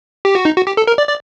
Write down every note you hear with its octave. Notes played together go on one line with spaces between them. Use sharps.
G4
F#4
D#4
F#4
G4
A4
A#4
D5
D5